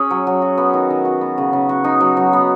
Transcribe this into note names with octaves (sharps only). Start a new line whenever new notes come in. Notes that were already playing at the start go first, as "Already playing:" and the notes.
Already playing: C#4 G#4
F#3
F#3
F#4
B3
D#3
D#3
F#4
B3
C#3
C#3
F#4
D#4
F#3
F#3
B3